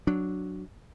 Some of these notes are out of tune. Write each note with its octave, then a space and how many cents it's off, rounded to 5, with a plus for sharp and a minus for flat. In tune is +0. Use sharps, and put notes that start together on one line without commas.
F#3 +0 D4 +0